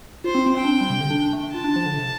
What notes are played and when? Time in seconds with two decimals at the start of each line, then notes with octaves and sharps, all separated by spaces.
0.24 F4 C5
0.35 C4
0.46 C4
0.57 C4 G5
0.65 D4
0.73 C4
0.81 G3
0.90 C3
1.00 D3
1.10 D4
1.22 D4
1.33 A3
1.44 D4
1.54 F4 A5
1.64 D4
1.76 F3
1.86 D3
1.97 C3